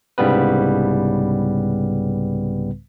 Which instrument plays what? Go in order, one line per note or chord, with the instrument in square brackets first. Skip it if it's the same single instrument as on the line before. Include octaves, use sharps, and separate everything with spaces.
[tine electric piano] C2 G#2 C#3 G3 B3 B4